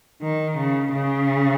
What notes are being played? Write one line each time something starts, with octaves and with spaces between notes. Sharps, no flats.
D#3
C#3
C#3